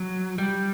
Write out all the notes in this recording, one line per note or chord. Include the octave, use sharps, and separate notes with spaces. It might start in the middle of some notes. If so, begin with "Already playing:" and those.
Already playing: F#3
G3